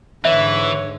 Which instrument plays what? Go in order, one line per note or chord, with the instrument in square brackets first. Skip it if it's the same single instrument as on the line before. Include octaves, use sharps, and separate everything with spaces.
[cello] G#2 D3 [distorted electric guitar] E3 [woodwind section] B4 C#5 [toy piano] E5